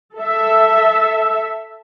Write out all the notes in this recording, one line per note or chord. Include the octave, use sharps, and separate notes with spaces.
A4 E5